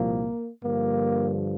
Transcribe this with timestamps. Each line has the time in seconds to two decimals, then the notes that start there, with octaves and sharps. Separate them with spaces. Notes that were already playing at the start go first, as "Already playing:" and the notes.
Already playing: C2 A#2 F3 A#3
0.63 G2 D3 F3 A#3